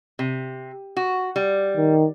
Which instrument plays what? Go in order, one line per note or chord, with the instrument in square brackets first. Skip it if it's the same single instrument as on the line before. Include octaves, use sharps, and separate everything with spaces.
[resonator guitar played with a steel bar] C3
F#4
G3
[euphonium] D#3